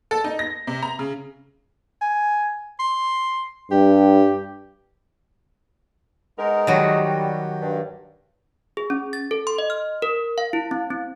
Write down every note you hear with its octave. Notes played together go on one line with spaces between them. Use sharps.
A4
D#4
A#6
C3
A#5
C#3
G#5
C6
G2 G4
G#3 B3 D#4 A#4
D#3 F#3 G3 F#4
G4
G2
G#4
C#4
A6
A4
C6
D#5
F6
A#4
F5
E4
C4
C4